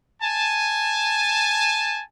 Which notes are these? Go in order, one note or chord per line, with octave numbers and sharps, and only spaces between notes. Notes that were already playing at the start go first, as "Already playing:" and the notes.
G#5 A5